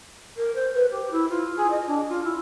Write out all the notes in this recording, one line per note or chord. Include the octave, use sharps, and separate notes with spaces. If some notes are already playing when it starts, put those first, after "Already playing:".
A#4
C5
B4
G4
E4
F4
G#4
D#5
D4
F4
E4